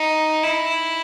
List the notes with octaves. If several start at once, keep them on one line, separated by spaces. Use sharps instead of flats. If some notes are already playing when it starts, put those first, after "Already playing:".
Already playing: D#4
E4